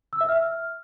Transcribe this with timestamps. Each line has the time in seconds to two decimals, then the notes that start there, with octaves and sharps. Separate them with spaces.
0.13 E6
0.21 E5
0.29 F6